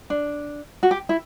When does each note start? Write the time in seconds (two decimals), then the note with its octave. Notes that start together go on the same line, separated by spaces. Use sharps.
0.10 D4
0.83 F#4
0.91 G4
1.09 E4